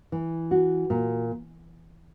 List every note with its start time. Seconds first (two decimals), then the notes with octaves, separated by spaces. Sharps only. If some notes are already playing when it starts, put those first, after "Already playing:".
0.12 E3
0.51 F#4
0.90 A#2